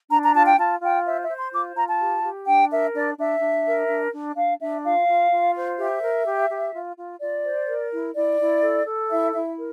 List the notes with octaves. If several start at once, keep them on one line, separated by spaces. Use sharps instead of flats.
D4 A#5
A#5
F4 A5
G5
F4 A5
F4 G5
C5 E5
E5
C5
C6
F4 D6
F4 A#5
A5
G4
G4
D4 G5
A#4 E5
D4 D5
D4 E5
D4
A#4
D4
D4
D4 F5
D4 E5
F4 F5
F4
F4
C5
G4 E5
A#4
G4
G4
F4
F4
F4 D5
C5
A#4
E4
E4 D5
E4
A4
A4
E4 E5
E4 E5
A#4